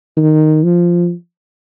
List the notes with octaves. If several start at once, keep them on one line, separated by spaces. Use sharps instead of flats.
D#3
F3